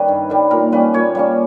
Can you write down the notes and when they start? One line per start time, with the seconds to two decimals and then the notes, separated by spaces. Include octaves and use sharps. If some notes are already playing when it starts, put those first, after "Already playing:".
Already playing: D#3 G3 C#4 B4 C#5
0.08 G2
0.30 D#3 G3
0.51 A#2 A#4
0.72 G3 A#3 C#4 B4
0.94 A#2 C#5
1.15 G3 A#3 C#4